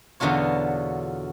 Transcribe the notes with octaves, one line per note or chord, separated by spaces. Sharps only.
E2 B2 D3 F#3 F4 C#5